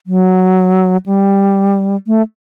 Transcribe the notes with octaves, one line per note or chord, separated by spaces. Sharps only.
F#3
G3
A3